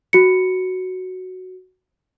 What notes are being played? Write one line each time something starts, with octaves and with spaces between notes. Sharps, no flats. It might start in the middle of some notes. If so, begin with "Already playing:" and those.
F#4 C#7